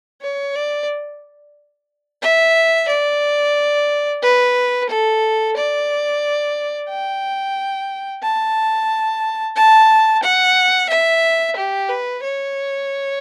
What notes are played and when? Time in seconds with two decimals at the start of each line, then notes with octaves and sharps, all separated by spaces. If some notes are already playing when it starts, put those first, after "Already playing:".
0.22 C#5
0.55 D5
2.22 E5
2.89 D5
4.22 B4
4.90 A4
5.56 D5
6.89 G5
8.23 A5
9.56 A5
10.23 F#5
10.90 E5
11.56 G4
11.89 B4
12.23 C#5